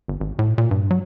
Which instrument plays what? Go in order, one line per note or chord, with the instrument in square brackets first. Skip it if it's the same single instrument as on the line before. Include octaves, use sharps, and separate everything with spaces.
[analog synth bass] G1
G#1
A2
A#2
G2
F#3